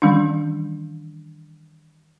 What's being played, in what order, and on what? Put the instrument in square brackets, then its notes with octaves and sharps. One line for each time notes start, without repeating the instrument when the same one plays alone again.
[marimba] D#3 E3 G3 C#4 D4